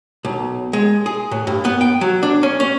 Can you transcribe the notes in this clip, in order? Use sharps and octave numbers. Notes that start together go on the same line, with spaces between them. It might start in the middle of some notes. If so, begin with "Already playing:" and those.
B1
G#3
G#4
A2
G2
B3
G5
F#3
D4
C#4
C#4